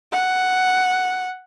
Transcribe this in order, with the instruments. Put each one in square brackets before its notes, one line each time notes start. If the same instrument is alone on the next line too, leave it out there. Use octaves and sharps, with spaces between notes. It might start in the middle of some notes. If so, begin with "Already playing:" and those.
[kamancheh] F#5